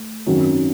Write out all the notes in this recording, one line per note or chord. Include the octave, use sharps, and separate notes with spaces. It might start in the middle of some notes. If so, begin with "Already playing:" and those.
Already playing: A3
G#1 F#2 D#3 F#3 C#4